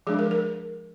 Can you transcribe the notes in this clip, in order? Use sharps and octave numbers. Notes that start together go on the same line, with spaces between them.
F3 G#3 D4 G#4
A#4
A#4